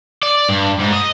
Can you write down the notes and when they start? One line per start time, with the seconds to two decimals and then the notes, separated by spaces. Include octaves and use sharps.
0.23 D5
0.49 G2
0.80 G#2
0.93 D#5